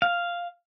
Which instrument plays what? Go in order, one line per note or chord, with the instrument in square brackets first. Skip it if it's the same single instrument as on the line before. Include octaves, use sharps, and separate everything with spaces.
[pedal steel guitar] F5